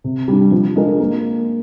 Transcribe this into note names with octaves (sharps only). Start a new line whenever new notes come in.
C3
G3 D4
F3
G#3 D4 F4 A#4
A#3